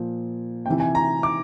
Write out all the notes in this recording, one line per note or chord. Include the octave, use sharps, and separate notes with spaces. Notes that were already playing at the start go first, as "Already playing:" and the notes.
Already playing: A#2 F3
C3 E3 G5
G#5
A#5
D6